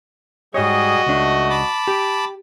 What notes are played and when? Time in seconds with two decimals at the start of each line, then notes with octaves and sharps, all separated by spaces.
0.54 G#2 G3 F#4 G#4 C#5 D#5
1.06 C#2 A3 D4
1.50 A5 B5 D6
1.88 G4